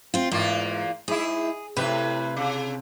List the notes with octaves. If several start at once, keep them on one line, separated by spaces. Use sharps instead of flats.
C4 F4
E2 G#2 A#3 F4
G#2 E4 G#4
A2 C3 D#3 B4
C#3